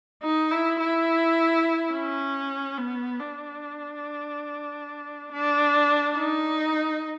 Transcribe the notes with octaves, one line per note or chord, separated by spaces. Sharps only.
D#4
E4
E4
C#4
B3
D4
D4
D#4